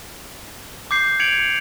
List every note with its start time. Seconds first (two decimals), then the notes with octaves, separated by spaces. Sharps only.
0.91 D6 G6 C7
1.20 G#6 C#7 D7 F7 F#7